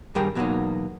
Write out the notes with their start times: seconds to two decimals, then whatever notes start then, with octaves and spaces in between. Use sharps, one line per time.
0.15 G2 D#3 G3 G#4 A#4 G5
0.35 E2 B2 F#3 G3 A#3 D#4